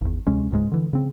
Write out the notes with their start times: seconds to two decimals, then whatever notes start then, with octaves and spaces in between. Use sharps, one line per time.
0.01 G#1 E2
0.27 D2 C3 G#3 C#4
0.51 D1 C#2 G#2 G#3
0.72 D3 E3
0.93 C#3 C4